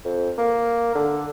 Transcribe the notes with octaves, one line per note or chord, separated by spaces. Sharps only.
F2
A#3
D3